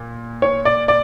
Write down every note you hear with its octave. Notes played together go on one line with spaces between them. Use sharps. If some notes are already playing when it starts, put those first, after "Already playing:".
Already playing: A#2
C#5
D5
D5